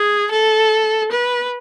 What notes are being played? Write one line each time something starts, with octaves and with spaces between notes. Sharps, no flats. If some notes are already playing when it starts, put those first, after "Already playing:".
Already playing: G#4
A4
B4